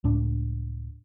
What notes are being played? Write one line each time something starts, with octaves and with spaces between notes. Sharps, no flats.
C#2 A2 D4